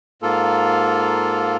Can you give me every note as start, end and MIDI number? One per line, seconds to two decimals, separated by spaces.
0.22 1.57 44
0.22 1.57 58
0.22 1.57 65
0.22 1.57 69